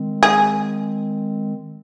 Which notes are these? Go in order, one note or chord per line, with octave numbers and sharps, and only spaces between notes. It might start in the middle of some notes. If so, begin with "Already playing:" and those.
Already playing: D#3 G#3 C4
G#4